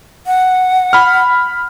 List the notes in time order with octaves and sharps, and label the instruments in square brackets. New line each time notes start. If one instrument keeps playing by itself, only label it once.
[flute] F#5
[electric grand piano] B5 F6